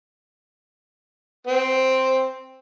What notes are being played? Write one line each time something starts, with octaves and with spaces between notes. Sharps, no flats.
C4